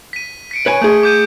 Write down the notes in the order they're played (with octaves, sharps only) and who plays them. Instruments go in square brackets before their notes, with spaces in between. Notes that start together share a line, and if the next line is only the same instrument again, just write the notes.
[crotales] B6 D#7
B6 C#7 D7
[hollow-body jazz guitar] B4 C#5 G#5
A3 G#4
[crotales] D6 G6 D#7